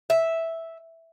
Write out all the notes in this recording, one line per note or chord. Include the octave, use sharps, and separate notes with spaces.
E5